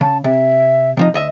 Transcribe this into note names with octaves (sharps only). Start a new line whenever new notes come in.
C#3 A5
C3 E5
C3 F3 D#4
D2 D#5 E5